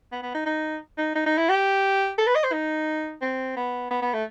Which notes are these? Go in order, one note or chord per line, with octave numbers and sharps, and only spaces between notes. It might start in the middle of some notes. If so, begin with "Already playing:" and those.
B3
B3
D#4
D#4
D#4
D#4
D#4
E4
G4
A4
B4
D#5
C5
D#4
C4
B3
B3
B3
A3